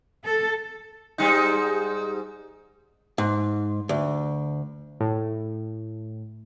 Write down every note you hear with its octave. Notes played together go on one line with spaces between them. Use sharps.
A4
G#2 G3 D#4
G#2
D2
A2